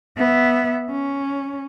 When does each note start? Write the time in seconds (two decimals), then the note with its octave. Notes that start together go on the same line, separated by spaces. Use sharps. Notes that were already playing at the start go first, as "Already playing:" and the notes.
0.17 B3 E5
0.90 C#4